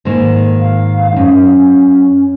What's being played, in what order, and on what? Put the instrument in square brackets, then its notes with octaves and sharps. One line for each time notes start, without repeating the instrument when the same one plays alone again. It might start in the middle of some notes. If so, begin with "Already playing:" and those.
[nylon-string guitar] G#2 D#3 A#3
[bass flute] F5
[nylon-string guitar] F#2 [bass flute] C#4